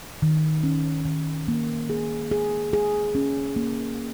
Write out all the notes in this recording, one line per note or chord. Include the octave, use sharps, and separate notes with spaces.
D#3
C#4
D#3
A#3
G#4
G#4
G#4
C#4
A#3